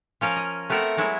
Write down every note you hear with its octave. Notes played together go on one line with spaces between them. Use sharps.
F3 C#4 A#4 F5
D#5
A3 B3 C4 A#4 E5 F#5
F#3 G#3 B3 E4